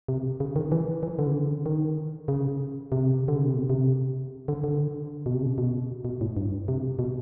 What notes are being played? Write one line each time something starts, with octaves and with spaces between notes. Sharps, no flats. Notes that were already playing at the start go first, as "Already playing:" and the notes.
C3
C#3
D#3
E3
E3
D3
C#3
D3
D#3
C#3
C3
D3
C#3
C3
B2
C3
D3
D3
B2
C3
C#3
B2
B2
A2
G2
C3
B2